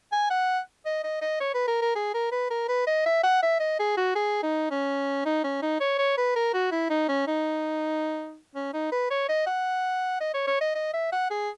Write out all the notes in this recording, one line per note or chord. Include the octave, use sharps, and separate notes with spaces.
G#5
F#5
D#5
D#5
D#5
C#5
B4
A#4
A#4
G#4
A#4
B4
A#4
B4
D#5
E5
F#5
E5
D#5
G#4
F#4
G#4
D#4
C#4
D#4
C#4
D#4
C#5
C#5
B4
A#4
F#4
E4
D#4
C#4
D#4
C#4
D#4
B4
C#5
D#5
F#5
D#5
C#5
C#5
D#5
D#5
E5
F#5
G#4